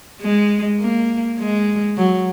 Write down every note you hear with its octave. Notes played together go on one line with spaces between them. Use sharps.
G#3
A#3
G#3
F#3